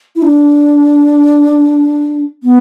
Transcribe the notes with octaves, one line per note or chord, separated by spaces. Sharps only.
E4
D4
B3